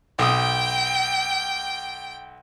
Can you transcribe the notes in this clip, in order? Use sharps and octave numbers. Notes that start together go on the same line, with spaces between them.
B1 G5 D#6